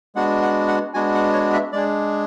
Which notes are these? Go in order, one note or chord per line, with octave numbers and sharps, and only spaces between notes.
G#3 B3 D4 F#4 F#5
F#5
F#5
G#3 B3 D4 F#4 G#5
F#5
C#5
E5
G#3 D4 G#4 D5